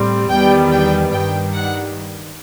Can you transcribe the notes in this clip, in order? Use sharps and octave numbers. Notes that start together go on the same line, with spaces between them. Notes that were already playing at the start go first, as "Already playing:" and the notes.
Already playing: A2 G3 C4
E2 D#3 G3 B3 G5
G5
G2 D#3 G3 G5
F#5